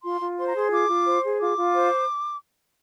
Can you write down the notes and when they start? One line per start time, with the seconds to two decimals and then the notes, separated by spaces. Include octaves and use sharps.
0.03 F4 C6
0.21 F4
0.38 C5 C6
0.47 A#5
0.55 G#4 C6
0.72 F4 D6
0.88 F4
1.06 C5
1.23 G#4
1.40 F4 D6
1.58 F4
1.74 C5